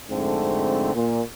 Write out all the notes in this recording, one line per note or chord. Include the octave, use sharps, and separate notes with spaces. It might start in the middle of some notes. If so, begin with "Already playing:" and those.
F2 G#2 D3 A3 C4
A#2